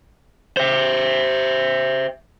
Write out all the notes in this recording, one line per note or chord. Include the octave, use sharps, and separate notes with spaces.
C5 E5